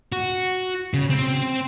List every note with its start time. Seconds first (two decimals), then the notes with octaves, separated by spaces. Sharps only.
0.12 F#4
0.94 C#3
1.10 C4